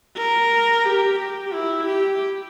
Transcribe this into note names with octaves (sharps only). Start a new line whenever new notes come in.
A#4
G4
G4
E4
G4